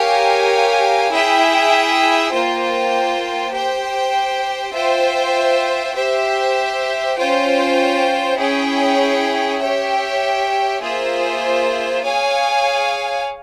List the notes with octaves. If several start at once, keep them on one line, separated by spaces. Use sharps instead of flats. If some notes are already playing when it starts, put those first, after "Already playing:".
Already playing: G4 A#4 C#5 F5 G#5
E4 G#4 E5 G5
A#3 F4 C5 G5
G4 C5 G5
F4 C5 E5 G5
G4 C5 E5
C#4 F4 C5 G5
C#4 E4 G#4 C#5 G5
G4 C#5 E5 G5
A#3 F4 G#4 C5 E5
G#4 C#5 F5 G#5